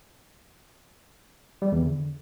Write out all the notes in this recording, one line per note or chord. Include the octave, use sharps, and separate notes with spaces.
G3
E2
D3